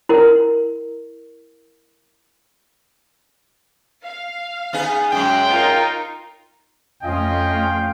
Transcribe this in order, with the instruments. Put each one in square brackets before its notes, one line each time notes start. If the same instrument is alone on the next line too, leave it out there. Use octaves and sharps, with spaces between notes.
[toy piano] E4 A#4
[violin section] F5
[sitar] B3 D#4 G#4
[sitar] F#2 F#3 G#3 [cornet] G5
[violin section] D#4 F4 A#4
[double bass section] F2 A3 [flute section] C#4 F4 F5 [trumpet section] D#5 G#5 [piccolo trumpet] G5